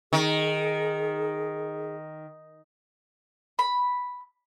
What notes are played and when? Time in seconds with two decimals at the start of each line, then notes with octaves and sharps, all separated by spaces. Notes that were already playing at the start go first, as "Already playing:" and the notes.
0.13 D#3 G#4
3.59 B5